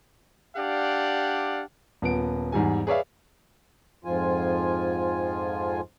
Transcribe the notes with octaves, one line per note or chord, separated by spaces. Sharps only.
D4 G4 D5 F5 F#5
D#1 B3 D7
E2 G#2 G3 G#5
G#4 B4 C#5 D5 E5 F5
F2 G#2 F3 F4 G#5